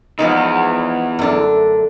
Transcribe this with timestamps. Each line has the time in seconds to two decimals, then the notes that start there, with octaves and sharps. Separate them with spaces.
0.19 E2 F3 G#3 D#4
1.19 F#2 D3 A3 D4